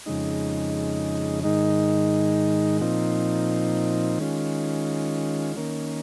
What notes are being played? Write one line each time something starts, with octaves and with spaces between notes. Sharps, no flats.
F2 C#3 G#3 D#4
G#2 D#3 G#3 D#4
A#2 F3 C4 D#4
D#3 G#3 C#4 F4
D#3 A#3 C#4